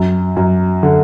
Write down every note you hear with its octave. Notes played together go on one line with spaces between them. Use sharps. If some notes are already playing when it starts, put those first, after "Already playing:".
Already playing: F#2
F#2
D3